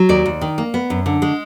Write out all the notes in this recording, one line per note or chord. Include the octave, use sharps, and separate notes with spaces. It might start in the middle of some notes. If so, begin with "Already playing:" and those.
Already playing: F#3
D#2 D5
D#2
D#3
A#3
B3
F#2
D3
G#3